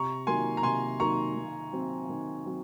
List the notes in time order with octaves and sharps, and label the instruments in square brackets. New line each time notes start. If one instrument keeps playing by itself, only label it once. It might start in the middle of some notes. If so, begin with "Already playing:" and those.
Already playing: [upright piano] C3 [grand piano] A#5 C#6
[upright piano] D#3 F#3 A#3 [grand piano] G#5 C6
[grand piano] A#5
[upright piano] C3 [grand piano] G#5 C6
[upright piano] D#3 F#3 A#3 [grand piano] A#5 C#6
[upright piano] D#3
F#3 C4
D#3
F#3 C4